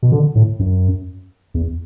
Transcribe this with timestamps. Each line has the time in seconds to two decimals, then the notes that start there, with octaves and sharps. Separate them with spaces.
0.03 B2
0.12 D3
0.35 A2
0.59 F#2
1.54 E2